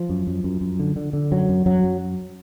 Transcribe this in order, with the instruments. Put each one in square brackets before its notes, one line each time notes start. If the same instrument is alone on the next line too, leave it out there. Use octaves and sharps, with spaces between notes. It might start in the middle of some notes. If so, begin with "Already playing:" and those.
Already playing: [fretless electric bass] F3
F#2
F#2
F#2
F#2
D3
D3
D3
F#2 F#3
F#2
F#2 F#3
F#2